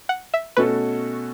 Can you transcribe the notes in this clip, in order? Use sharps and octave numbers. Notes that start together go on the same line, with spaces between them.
F#5
E5
B2 A3 C#4 F#4 A4 B4